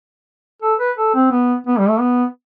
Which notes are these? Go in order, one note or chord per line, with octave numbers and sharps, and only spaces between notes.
A4
B4
A4
C4
B3
B3
G3
A3
B3